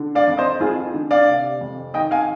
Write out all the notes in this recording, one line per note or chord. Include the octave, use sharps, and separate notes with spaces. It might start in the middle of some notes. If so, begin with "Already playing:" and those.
Already playing: D3
D5 F5
F2
C5 D#5
F2 F4 G#4
D3
D5 F5
C3
F2
D#3 D#5 G5
F5 G#5